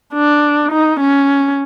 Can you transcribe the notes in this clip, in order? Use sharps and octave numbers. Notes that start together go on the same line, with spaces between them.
D4
D#4
C#4